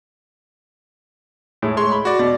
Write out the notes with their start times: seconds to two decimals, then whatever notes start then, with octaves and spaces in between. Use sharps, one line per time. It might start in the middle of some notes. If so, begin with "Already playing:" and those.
1.62 A2 G#3
1.77 G#3 C#5 C6
1.91 B5
2.05 F#4 D5
2.19 B2 D5